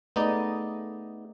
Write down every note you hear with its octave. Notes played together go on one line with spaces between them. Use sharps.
A3 B3 D#4 G#4 D5 D#5